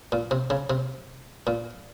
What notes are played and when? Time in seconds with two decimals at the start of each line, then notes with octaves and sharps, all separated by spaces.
0.12 A#2
0.31 C3
0.50 C#3
0.70 C3
1.47 A#2